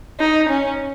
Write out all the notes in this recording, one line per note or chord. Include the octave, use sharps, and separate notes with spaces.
D#4
C#4